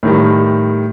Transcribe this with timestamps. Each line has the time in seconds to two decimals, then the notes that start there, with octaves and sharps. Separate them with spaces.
0.03 A2 D#3 G3